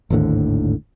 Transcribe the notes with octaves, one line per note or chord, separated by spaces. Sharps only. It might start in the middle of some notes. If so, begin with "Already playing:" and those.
G#1 D#2 A2 D3